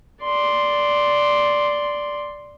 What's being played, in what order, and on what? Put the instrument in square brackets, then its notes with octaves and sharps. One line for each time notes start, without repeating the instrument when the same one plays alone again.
[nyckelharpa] D5 C6